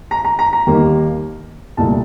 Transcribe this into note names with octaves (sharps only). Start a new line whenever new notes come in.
A#5
A#5
A#5
A#5
D#2 D#3 G3 A#3
C2 A#2 A3 A5